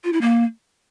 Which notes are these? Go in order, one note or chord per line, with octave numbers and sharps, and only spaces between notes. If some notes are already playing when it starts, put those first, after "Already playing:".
F4
E4
A#3